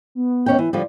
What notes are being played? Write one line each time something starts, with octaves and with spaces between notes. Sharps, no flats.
B3
D#2 C#4 G5
E3
D3 F3 G3 D5